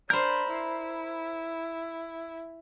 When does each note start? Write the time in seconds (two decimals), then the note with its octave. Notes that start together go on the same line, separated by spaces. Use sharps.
0.10 D4 A#4 C5 B5 G6
0.48 E4